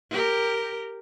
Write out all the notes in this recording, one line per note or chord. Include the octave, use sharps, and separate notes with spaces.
G4 A#4